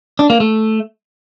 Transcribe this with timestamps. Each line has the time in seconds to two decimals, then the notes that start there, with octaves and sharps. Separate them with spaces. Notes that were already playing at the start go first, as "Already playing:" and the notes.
0.19 D4
0.30 A#3
0.40 A3